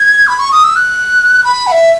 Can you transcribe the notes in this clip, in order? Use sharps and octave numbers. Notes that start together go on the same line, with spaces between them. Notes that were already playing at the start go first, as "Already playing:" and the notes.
Already playing: G#6
B5
C#6
D#6
E6
F#6
B5
F#5
E5